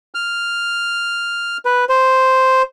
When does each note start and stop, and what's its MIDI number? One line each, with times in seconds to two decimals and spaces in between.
0.15 1.57 89
1.65 1.85 71
1.89 2.62 72